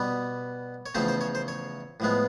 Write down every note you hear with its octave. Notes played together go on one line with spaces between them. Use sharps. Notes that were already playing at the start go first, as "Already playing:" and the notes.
Already playing: B2 G3 B3
C#5
E2 C#3 F3 A3 C4 C5
C5
C#5
C5
C#5
A2 F3 G#3 B3